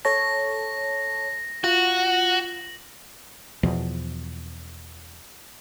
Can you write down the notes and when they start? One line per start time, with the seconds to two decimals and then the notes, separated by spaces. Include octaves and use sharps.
0.05 A4 C#5 A5 A#6
1.64 F4 F#4 F#7
3.63 E2 B2 F3